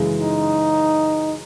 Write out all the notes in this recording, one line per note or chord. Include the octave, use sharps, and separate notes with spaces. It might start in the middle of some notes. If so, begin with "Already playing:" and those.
Already playing: F#2 C#3 E3 G#3
D#4